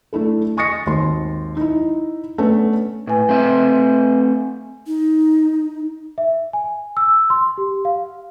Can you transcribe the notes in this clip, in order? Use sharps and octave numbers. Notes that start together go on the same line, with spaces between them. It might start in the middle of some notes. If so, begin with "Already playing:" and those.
A3 D4 E4 A4
G#5 C#6 D#6 A6 A#6 C#7
G#1 D#2 C6
D#4 E4
A3 B3 C#4 D4
A2 B4 G#5
A3 C4 E5
D#4
E5
G#5
E6
C6
G4
F5